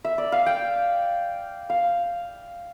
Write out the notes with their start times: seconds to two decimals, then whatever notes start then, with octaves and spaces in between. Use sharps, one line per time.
0.04 E5
0.18 D5
0.32 F5
0.46 G5
1.70 F5